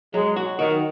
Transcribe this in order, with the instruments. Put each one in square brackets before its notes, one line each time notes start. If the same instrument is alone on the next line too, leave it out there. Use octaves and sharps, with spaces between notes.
[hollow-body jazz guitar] F#3 [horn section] G#3
[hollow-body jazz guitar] F#4
[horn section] D#3 [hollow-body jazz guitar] F#4